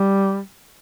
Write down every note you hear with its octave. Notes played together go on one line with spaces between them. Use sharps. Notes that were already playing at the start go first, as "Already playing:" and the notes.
Already playing: G3